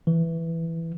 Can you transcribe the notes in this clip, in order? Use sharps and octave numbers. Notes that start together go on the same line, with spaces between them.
E3